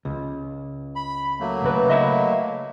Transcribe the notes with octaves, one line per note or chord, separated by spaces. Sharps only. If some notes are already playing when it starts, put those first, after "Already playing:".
C#2
B5
F#3 A3 A#3
C#3 B4
D#5 E5 B5